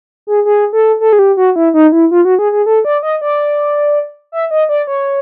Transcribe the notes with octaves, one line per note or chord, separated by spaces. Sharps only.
G#4
G#4
A4
A4
G#4
G4
F#4
E4
D#4
E4
F4
F#4
G#4
G#4
A4
D5
D#5
D5
E5
D#5
D5
C#5